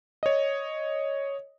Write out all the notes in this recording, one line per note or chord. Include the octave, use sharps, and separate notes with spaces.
C#5 D#5